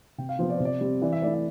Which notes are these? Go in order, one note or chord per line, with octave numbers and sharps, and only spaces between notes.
C3 G5
F5
F3 B3 F4 C5
D5
C5
C3
D5
G3 C4
E3 D5
E5
A3 E4 D5
E5